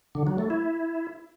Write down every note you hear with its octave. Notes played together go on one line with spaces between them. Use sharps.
D3
F#3
A3
E4